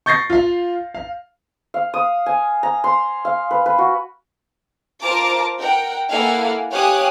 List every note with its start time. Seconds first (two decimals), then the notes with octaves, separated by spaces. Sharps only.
0.06 C#6 G6 A6 A#6 C7
0.30 F4 F5
0.94 F5
1.74 F5
1.94 D#6
2.26 G#5
2.63 A#5
2.84 C6
3.25 F5
3.51 B4
3.66 B4
3.78 F#4
5.00 F4 A#4 C5 A5 A#5 D6
5.59 A#4 F#5 G5
6.11 A#3 E4 A4 F5 F#5 G#5
6.71 G4 C#5 F5 G#5 D#6 F#6